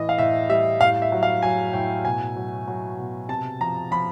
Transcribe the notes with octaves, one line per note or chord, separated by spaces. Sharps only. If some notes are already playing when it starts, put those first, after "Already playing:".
Already playing: A2 E3 D#5
F5
A2 E5
G3 E5
A2 F5
E5
F#3
F5
F#3 G#5
A2 G5
B2 G#5
F#3
F#3
B2
C3 A5
F3 A#5
F3 B5